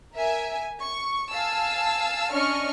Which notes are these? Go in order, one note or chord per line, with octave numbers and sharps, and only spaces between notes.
A#4 E5 G#5
C#6
F5 G#5 A5 E6
C#4 D4 D#5 C#6 F6